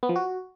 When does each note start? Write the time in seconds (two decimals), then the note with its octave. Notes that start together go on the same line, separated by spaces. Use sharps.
0.03 B3
0.09 F3
0.16 F#4